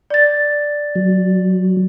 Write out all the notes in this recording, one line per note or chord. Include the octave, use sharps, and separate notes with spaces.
D5 A6
F#3